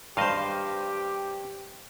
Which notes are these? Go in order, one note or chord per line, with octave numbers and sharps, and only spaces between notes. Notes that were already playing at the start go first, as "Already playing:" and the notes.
G2 G4 C5 D#5 F5